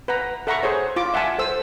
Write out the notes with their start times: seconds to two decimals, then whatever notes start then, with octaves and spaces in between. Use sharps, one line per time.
0.08 B4 F#5 A#5
0.47 A4 E5 F#5 A#5 B5 C#6
0.63 G#4 C5 C#5
0.96 F4 D6
1.14 E5 F#5 G#5 A5
1.38 A4 C5 E6